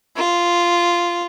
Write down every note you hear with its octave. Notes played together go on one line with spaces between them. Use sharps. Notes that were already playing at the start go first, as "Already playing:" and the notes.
F4